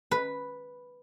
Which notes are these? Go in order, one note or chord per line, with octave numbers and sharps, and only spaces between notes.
B4